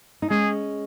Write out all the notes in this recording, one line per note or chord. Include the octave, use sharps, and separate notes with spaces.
D#4
G#3 C#4 G#4